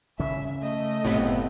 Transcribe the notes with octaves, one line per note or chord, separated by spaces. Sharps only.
C#3 C#4 E5
A3 D#5
F#1 A2 C3 B3